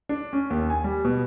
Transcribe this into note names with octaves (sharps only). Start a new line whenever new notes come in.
D4
C#4
D#2
G#5
G3
B2